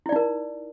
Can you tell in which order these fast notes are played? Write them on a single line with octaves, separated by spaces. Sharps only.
E4 D5 D#4 A#4